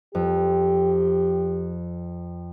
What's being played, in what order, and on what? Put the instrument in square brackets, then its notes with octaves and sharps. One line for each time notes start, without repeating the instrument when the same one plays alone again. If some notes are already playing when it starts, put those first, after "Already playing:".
[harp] F2 [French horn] G4